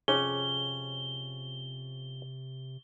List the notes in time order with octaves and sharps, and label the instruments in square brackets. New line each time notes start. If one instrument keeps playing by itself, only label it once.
[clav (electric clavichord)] F2 C#4 [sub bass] C3 [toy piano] G#4 C#5 [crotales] G7